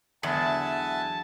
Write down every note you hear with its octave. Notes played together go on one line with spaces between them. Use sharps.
E2 D3 F#3 G#3 E5 F#5 G#5 A5